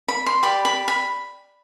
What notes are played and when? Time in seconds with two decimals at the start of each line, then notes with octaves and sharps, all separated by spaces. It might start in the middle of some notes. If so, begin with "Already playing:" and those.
0.08 B5
0.26 C6
0.43 G4 D5 B5
0.65 B5
0.88 B5